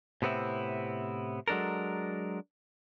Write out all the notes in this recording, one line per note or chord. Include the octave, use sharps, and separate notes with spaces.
A2 C3 B3 C4 E4
F#3 G#3 D4 A4 A#4